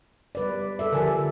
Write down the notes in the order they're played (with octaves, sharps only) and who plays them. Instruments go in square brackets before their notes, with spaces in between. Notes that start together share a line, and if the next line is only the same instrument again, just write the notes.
[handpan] G3 B4 D5
A4 D5 E5
[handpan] D3 F3 G4 [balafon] A#4 G#5